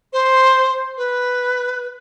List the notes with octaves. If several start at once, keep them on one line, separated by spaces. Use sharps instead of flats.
C5
B4